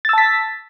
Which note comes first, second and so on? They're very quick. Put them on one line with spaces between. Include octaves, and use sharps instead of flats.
A6 E6 A5 B6